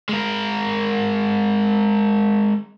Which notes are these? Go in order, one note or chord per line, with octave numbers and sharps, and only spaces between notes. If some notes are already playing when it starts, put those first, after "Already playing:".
G#3 A#4